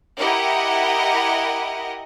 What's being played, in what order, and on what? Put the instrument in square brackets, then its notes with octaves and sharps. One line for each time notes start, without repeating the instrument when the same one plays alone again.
[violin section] E4 G4 A#4 D#5 F#5